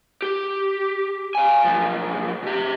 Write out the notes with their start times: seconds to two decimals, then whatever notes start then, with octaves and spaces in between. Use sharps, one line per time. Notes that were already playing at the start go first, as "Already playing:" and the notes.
0.22 G4
1.35 F5 G#5
1.64 B1 F3
2.43 B2 G4